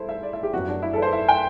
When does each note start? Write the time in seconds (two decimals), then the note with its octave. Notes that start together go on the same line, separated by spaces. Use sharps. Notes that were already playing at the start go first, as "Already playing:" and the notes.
Already playing: E2 G3 E4 A4 C5
0.09 E5
0.23 D5
0.33 E5
0.43 G4
0.53 F#2 F#3 B3 F#4
0.68 D4
0.82 E4
0.93 A4 B4
1.02 C5
1.13 E5
1.28 G5